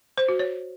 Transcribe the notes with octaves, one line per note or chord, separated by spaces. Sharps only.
C5
F#4
C#5